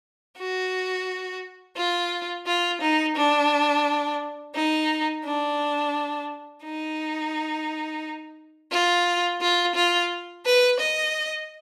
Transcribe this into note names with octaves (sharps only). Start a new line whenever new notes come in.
F#4
F4
F4
D#4
D4
D#4
D4
D#4
F4
F4
F4
B4
D#5